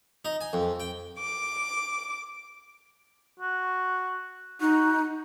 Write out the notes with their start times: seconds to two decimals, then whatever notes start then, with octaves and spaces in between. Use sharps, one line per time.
0.25 D#4
0.41 G#5
0.53 F2
0.80 G5
1.19 D6
3.40 F#4
4.61 D#4 F#4